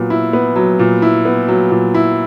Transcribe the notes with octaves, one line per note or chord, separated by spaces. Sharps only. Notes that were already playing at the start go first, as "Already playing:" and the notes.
Already playing: A#2 F#3 B3
E4
B3
F#3
A#2
E4
B3
F#3
A#2
E4